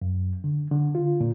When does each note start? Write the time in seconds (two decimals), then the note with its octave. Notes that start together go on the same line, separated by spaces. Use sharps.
0.02 F#2
0.44 D3
0.71 D3
0.95 F4
1.21 A#2